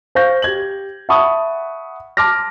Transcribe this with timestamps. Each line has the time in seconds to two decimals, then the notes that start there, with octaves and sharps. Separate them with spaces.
0.15 C5 F5 C#6 G6 A#6
0.42 G4 G#6 F#7
1.09 E5 F#5 A5 B5 C#6 D#6
2.17 A5 C6 D6 F6 A#6